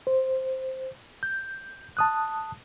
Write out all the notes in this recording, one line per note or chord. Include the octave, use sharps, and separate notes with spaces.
C5
G6
A5 D#6 F#6